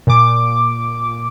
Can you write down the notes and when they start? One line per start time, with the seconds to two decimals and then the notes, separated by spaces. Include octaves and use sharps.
0.07 A#2 D6